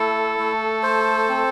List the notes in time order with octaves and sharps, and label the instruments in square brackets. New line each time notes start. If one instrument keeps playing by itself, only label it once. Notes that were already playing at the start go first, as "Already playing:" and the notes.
Already playing: [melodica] A3 E4 [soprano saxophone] A4
[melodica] A3
C5
C4